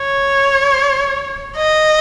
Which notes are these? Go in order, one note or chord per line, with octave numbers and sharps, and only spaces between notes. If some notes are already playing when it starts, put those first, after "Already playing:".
Already playing: C#5
D#5